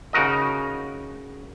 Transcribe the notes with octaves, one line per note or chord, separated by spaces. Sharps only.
C#3 D#4 F#4 A#4 D#5